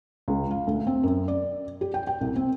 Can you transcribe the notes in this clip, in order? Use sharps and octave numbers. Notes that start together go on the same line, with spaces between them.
C#2
F5
D2
C4
F#2
D5
G4
G5
G5
C2
C4